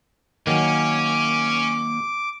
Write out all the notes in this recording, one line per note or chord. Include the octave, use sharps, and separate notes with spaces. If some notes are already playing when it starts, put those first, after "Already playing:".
D#3 F#3 A#3 C#4 D6